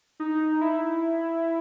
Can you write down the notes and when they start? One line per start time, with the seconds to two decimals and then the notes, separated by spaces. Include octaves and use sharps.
0.20 D#4
0.61 E4